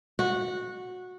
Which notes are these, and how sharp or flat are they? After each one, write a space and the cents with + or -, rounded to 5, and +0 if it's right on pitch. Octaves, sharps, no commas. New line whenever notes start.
F#4 -15